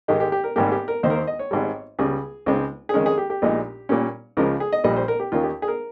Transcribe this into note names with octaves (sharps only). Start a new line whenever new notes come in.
G#2 D#3 G#3 D#4 G4
G4
G4
A#4
G#1 G#2 G3 A#3 G4
G4
A#4
D#2 D#3 A#3 D#4 C5
A#4
C5
D#5
C#5
G#1 G#2 G3
C#2 C#3 G3 G#4
C#2 C#3 G#3 C4 D#4
G#4
F2 D#3 G#3 C#4 A#4
G#4
G4
G4
A#1 A#2 G#3 D#4
A#2 G3 C#4
C#2 C#3 F3 G#3 A#4
G#4
D#5
A#1 A#2 G3 D#5
C5
A#4
G4
D#2 D#3 A#3 C#4 F4
G4
G#4
A#4